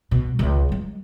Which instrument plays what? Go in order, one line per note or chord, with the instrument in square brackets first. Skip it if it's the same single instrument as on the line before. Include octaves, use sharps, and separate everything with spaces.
[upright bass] B2
C#2 F3
F#3 G#3